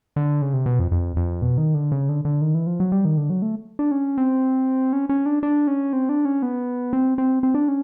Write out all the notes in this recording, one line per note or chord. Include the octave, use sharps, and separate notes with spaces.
D3
C#3
C3
B2
F2
F2
F2
B2
D#3
D3
C#3
D3
D3
D#3
E3
F3
F#3
G3
D#3
D3
F#3
A3
D4
C#4
C4
C#4
C#4
D4
D4
C#4
C4
D4
C#4
B3
C4
C4
C4
D4
C#4